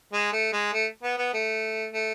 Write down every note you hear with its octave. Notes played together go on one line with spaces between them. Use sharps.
G#3
A3
G#3
A3
B3
B3
A3
A3